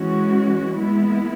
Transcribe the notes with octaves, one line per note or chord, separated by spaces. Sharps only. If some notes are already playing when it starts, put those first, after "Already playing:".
Already playing: E3 G#3 C#4 F#4
G#3 B3 E4